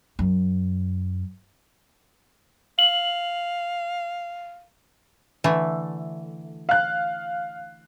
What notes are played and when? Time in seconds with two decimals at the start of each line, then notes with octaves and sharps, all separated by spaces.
0.19 F#2
2.79 F5 F#7
5.44 D3 E3 A3
6.69 F5 F#6